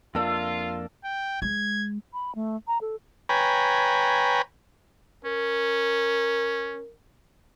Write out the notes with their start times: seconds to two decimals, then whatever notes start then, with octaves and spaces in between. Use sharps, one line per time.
0.15 F2 A#3 D4 F4 A4 E5
1.04 G5
1.42 G#3 G#6
2.13 B5
2.35 A3
2.67 A#5
2.81 A4
3.29 B4 C#5 G5 G#5 A#5 B5
5.25 C#4 A#4